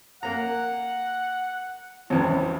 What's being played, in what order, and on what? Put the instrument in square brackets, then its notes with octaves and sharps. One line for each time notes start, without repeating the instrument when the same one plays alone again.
[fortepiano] A#3 A#5 [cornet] F#5
[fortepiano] G#1 E2 [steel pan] C4 C#4 B4 [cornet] E4